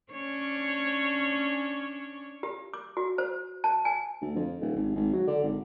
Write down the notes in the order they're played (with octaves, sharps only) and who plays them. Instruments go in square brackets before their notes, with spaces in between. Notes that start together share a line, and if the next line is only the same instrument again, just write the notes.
[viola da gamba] C#4 D4 C#5
[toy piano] G4
D6
F#4
C5
A5
G#5
[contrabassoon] D2
F2
D#1
G#1
G#1
F#3
D3
G#1